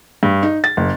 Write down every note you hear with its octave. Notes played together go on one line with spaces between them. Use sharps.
G2
D#4
A6
F#1